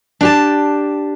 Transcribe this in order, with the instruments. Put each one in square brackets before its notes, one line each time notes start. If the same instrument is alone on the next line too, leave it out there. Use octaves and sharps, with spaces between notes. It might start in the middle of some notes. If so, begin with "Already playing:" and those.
[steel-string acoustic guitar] D4 G4 A5